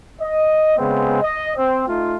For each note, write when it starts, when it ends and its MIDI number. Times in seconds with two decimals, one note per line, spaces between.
0.21 0.75 75
0.77 1.17 49
0.77 1.17 56
0.77 1.17 59
0.77 1.17 60
1.22 1.50 75
1.56 1.85 60
1.88 2.16 57
1.88 2.16 63
1.88 2.16 65